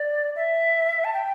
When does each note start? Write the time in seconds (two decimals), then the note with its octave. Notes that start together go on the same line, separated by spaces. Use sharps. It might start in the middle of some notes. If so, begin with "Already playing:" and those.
Already playing: D5
0.36 E5
1.04 A5
1.13 G5